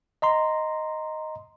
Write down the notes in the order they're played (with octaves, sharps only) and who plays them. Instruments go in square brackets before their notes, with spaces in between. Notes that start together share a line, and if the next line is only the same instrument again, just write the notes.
[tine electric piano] D#5 A#5 C6